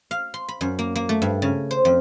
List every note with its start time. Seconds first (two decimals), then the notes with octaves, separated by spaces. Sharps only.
0.11 F5
0.34 C6
0.49 B5
0.61 F#2
0.79 A#3
0.96 A#3
1.09 A3
1.22 G2
1.42 C#3
1.71 C5
1.85 F2